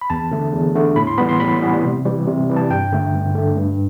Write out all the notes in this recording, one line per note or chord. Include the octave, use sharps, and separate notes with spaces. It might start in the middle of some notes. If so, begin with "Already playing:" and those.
B5
E2 A5
D3 A3
E2
D3 A3
A2 B5
C6
E3 G3 B3 B5
C6
A2 B5
E3 G3 B3
C3
E3 G3
C3
E3 G3
A5
G2 G5
D3 A3
G2
D3 A3
G2